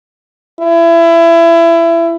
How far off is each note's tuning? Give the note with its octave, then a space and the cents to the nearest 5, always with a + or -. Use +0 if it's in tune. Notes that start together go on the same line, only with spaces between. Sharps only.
E4 +25